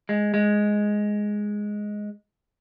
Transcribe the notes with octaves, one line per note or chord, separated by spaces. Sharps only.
G#3
G#3